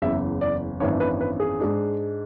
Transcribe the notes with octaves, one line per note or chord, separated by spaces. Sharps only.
F#1 E2 C#3 E5
D5
G#1 F#2 E3 B3 D4 C#5
B4
B4
G#4
G#2 G#3 D4